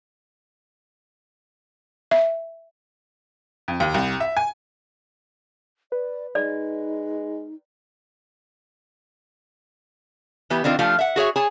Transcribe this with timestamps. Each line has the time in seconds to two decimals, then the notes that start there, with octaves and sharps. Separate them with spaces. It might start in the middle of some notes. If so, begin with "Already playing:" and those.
2.11 E5
3.68 F2
3.80 D#2
3.94 C2
4.20 E5
4.37 G#5
5.92 B4 D5
6.35 G#3 D#4 D5
10.50 E3 B3 G4
10.64 D#3 C4 D4 F4 B4 C5
10.79 F3 A3 D4 F4 G4
10.99 E5 F#5
11.16 F#4 G#4 C#5 E5
11.36 G#4 C#5 G#5 A5